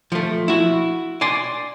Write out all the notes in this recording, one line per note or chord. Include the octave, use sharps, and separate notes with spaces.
F3 A3
E4 F#4
D5 G#5 C6